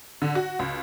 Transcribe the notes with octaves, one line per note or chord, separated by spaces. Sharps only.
D3
F#4
C#2